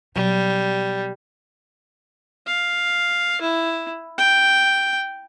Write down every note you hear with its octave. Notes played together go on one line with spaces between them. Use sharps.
B2 F#3 G3
F5
E4
G5